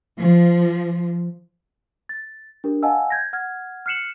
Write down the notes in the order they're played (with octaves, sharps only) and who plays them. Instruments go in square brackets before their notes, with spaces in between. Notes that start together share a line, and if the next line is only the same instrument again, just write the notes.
[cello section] F3
[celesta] A6
D4 G4 A#4
D#5 F5 F#5 G#5 A5 E6
G6 G#6 A#6
F#5 F6 G#6
F6 F#6 C7 C#7 E7 F#7